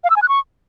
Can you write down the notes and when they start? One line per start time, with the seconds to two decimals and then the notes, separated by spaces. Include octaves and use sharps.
0.04 F5
0.10 E6
0.16 G#5
0.22 F#6
0.29 C#6